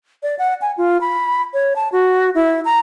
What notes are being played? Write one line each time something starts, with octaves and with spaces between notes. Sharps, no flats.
D5
F#5
G#5
F4
B5
C#5
A5
F#4
E4
A#5